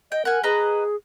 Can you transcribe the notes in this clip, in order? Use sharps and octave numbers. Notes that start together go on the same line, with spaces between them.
D#5 G5
A#4 F#5 G#5
G#4 B4 D#5 A#5